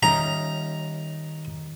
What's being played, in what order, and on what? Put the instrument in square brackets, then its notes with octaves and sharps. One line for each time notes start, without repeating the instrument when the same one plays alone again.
[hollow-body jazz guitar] D#3 G3 C#4 [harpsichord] A#5